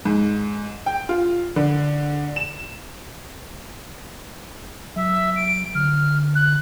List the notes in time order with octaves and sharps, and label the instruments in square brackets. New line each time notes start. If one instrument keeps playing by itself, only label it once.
[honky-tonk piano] G#2
G5
F4
D3
E7
[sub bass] F#3 [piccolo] E5
[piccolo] D7
[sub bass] D3 [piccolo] F6
[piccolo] F#6